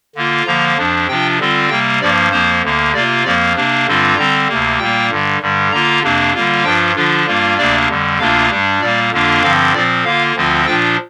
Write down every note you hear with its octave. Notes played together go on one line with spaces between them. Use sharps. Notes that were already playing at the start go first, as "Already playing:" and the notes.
D3 A#3 F4
D3 F3 A#3 A#5
F2 F3 D4
C3 F3 D4 F4 G5
D3 G3 C4 F4
C3 G3 A#3 G5
G2 F3 A#3 D5
F2 F3 A#3 C5
D2 D3 A#3
C3 A#3 F4 D5
F2 F3 A#3 D5
C3 A#3 D4
G2 D3 G3 C4 F4
D3 G3 C4 A#5
D2 C3 A#3
A#2 G3 A#3 G5
G2 D3 G3
G2 D3 G3
D3 A#3 F4 A#5
F2 C3 A#3 D4
D3 G3 A#3 F4
G2 F3 D4 F4 G5
D3 F3 D4 F4
G2 G3 A#3 F4
D2 C3 A#3 D4 D5
F2 D3 G3
D2 C3 A#3 D4 F4 F5
G2 G3 D4
A#2 G3 A#3 D5
F2 D3 A#3 D4 F4
G2 D3 F3 C4 F5
A#2 F3 C4 D5
D3 A#3 F4 F5
D2 D3 F3 C4 F4
A#2 F3 D4 F4 G5